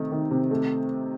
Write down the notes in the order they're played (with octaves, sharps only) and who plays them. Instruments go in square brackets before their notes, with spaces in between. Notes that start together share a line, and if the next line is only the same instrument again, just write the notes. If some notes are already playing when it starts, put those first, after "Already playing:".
Already playing: [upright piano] C3 D#3 A3 D#4
D#3
C3
A3